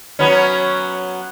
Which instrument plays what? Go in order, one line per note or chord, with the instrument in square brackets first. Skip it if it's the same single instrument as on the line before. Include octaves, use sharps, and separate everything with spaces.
[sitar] F#3 B3 C#4